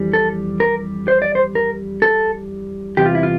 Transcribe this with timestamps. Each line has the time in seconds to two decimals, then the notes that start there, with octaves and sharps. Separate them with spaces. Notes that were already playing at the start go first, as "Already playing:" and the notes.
Already playing: F2 E3 G3
0.13 A4
0.60 A#4
1.08 C5
1.22 D5
1.35 C5
1.55 A#4
2.02 A4
2.97 E2 C3 G3 G4
3.06 F4
3.15 E4
3.23 F4